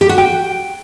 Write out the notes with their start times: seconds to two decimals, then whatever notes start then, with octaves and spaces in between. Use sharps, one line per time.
0.01 G4
0.09 F#4
0.18 G5